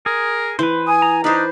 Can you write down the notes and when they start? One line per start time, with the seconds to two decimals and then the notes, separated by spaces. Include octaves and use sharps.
0.06 G#4 A#4
0.59 E3 B4 C5
0.87 G#5 D#6
1.02 A#5
1.24 D4 D#4 B4 C5